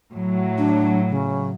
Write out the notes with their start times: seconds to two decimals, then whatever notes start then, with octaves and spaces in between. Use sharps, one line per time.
0.13 A2 F#3
0.58 D4
1.09 C#3